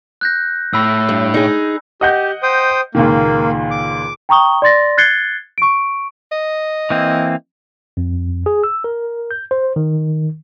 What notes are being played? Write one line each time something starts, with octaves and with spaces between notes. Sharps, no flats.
F#6 G6 A#6
A2 B5 E6
G2
D#4 G#4
G4 D#5 F#5 G6
C5 G5 D#6
C#2 A#2 D#3 A#3
D6
G5 A#5 C#6 D#6 G7
D5 C6 A6 A#6
F#6 G#6 A6 C7 C#7 G7
C#6 D7
D#5
E3 A#3 C4
F2
G#4
E6
A#4
G6
C5
D#3